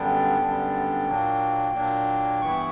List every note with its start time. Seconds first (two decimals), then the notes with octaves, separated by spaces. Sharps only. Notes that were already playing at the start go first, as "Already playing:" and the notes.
Already playing: F#2 D3 G3 B3 D4 G5
0.39 F#2 D3 G3 B3 D4
1.07 A#2 F#3 A#3 D4
1.74 A#2 F#3 A#3 D4
2.42 G2 E3 B3 E4 C#6